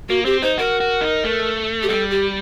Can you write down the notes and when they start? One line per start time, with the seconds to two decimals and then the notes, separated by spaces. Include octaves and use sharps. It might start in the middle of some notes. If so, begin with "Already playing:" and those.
0.09 A#3 F#4
0.25 C4 G4
0.42 D#4 C5
0.58 F#4 A#4
0.80 F#4
1.01 D#4
1.24 A3
1.83 G4
1.89 G3 A4
2.10 G4